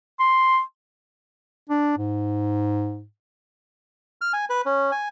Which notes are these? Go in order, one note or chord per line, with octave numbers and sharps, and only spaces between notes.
C6
D4
G#2
F6
G#5
B4
C#4
G#5